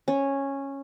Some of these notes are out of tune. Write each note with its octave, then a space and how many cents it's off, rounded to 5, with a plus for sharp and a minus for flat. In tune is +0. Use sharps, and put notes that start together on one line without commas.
C#4 -10